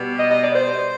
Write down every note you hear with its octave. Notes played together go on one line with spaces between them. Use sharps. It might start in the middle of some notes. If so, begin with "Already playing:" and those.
Already playing: B2 G3
D#5
D#5
D5
C5